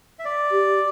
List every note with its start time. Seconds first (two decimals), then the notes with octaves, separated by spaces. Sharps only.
0.19 E5
0.25 D5
0.51 G4